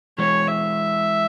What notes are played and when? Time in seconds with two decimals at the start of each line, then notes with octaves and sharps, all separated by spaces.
0.18 E3 G#3 C#5
0.47 E5